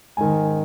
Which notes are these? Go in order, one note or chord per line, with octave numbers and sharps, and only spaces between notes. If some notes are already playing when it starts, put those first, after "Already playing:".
G#2 D#3 G#5